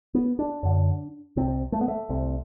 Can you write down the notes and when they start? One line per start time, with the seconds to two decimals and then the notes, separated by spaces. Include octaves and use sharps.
0.14 B3
0.39 D4
0.63 F#2 D3
1.36 C2 C3 C4
1.72 A3
1.81 B3
1.88 A3
2.09 C2 C3